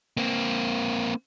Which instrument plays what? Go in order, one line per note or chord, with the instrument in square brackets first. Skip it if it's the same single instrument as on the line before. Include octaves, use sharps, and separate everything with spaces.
[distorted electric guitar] A#3 C4